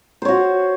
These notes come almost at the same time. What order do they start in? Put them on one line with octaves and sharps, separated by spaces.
C5 C#5 F#4